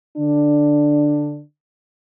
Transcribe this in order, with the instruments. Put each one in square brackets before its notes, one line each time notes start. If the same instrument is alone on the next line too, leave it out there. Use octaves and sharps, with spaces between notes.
[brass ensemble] D3 D4